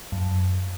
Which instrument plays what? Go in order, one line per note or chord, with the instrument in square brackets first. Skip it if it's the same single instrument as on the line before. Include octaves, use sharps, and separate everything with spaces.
[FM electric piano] F#2